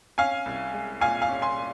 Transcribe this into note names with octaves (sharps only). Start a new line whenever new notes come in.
C#4 F5 G#5
C2
G#3
A#2 F5 G#5
F5 G#5
C#4
G#5 C6